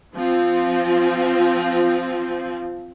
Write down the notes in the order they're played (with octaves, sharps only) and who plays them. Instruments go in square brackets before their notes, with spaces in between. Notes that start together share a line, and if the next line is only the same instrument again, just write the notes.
[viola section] F3 C4